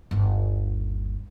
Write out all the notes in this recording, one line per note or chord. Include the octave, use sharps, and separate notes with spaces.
G1 D#2